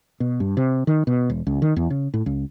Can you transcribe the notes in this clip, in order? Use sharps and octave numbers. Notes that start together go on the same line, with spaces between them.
B2
G2
C3
D#3
B2
E1
C#2
D#3
E2
C#3
A2
C#2